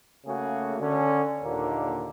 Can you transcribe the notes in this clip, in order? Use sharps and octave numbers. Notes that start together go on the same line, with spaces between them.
C#3 A3 A#3 F#4 G#4
D3 C#4
D#2 A#2 D3 D#3 A#3